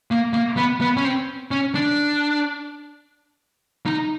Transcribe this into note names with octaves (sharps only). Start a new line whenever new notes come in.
A#3
A#3
B3
B3
C#4
C4
C#4
D4
D#4